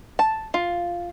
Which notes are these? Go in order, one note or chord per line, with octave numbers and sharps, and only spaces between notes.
A5
F4